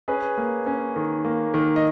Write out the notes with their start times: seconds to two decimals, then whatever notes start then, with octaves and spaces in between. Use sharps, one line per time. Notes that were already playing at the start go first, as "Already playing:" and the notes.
0.08 C#4 G#4 B4
0.38 A#3
0.66 C#4
0.96 D#3
1.25 A#3
1.54 D#3
1.76 D#5